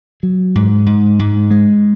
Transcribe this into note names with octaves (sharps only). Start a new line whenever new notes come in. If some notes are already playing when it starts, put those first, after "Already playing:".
F#3
G#2
G#2
G#2
G#3